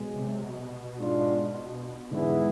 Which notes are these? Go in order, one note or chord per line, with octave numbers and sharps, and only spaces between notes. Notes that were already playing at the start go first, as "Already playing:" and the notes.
Already playing: B1 B2 G#3
C3
B2
G#2 G#3 D4 F4
G#2 D3 E3 B3 E4 G#4
G#3